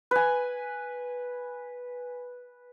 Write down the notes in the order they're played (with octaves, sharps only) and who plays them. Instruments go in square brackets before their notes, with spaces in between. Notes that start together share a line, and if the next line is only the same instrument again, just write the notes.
[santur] B4 G#5